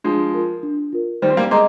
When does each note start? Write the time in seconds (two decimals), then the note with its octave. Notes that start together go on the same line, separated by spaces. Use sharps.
0.04 F3 G#3 D4
0.34 F4 A#4
0.63 D4
0.93 F4 A#4
1.22 D#3 G3 C5
1.30 C4
1.37 G3 A#3
1.51 G#3 C4 D#5 A#5 D6